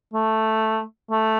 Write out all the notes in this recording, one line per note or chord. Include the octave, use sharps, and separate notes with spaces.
A3
A3